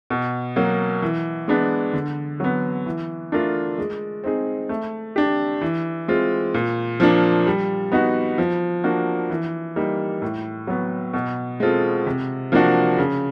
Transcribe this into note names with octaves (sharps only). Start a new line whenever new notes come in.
B2
F#3 A#3
E3
G#3 B3 D4
D3
F#3 B3
E3
A3 D4 F4 A#4
G#3
C4 D#4 G#4
A3
D4 G4
E3
G#3 C4 F4
A#2
F3 A#3 D4
G3
B3 D#4 F#4
F3
A#3 D4 F#4
E3
G3 A#3 D#4
A2
F#3 B3
B2
G#3 C4 F4 A4
C3
F3 A#3 D4 F#4
C#3